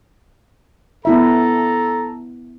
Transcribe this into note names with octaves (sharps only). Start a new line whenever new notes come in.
B3 E4 A4 E5 A#5